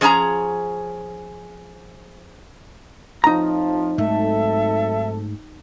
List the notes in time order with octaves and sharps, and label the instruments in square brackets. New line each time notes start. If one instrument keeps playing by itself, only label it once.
[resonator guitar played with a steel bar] F3 C#4 G#4 G#5 A#5
[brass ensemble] F2 A2 F3 [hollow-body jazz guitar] D#4 A#5
[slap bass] G#2 A3 [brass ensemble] F#3 C4 A4 [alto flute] E5